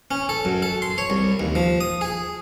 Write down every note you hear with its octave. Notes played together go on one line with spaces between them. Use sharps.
C#4
A4
F#2
A4
C6
C#5
C2
D#2
F3
D#6
G#4